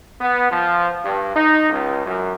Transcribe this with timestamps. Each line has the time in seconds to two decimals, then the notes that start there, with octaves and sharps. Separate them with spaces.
0.20 B3
0.50 F3
1.04 G2
1.34 D#4
1.69 C#2
2.05 F#2